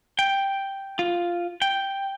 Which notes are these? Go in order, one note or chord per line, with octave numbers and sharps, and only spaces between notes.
G5
F4
G5